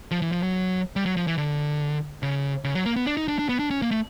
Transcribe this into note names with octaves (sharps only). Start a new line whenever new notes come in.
F3
E3
F3
F#3
G3
F#3
F3
E3
D3
C#3
C#3
F#3
A#3
B3
D4
D#4
D4
D4
B3
D4
C#4
A#3
A3